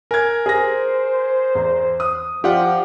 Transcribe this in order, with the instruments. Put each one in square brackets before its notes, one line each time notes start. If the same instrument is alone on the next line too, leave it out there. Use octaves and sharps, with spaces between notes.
[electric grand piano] A#4 [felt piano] G#5 G#6
[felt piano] G#4 A#6 [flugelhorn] C5
[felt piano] E2 A#5
D#6
[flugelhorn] F3 [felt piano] F4 [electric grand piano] G4 D5 F#5